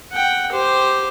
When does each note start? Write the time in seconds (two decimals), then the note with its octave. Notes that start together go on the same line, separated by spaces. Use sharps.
0.12 F#5 G5
0.52 G4 C5